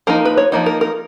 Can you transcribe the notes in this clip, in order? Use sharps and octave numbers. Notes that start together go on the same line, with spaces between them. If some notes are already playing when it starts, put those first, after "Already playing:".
F3 A#3 D#4 A#4
B4
C#5
F3 A#3 D#4
A#4
A#4